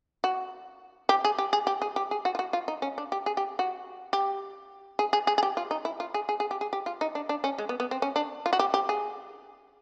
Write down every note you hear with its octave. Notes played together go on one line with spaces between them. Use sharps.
F#4
G4
G#4
G4
G#4
G4
G#4
G4
G#4
F#4
F4
F#4
F4
D#4
C#4
D4
G4
G#4
G4
F#4
G4
G#4
G#4
G#4
G#4
G4
F4
D#4
E4
F4
G#4
G#4
G#4
G4
G#4
G4
F4
D#4
D4
D4
C#4
G#3
B3
B3
C4
C#4
D4
F4
F#4
G4
G4
G#4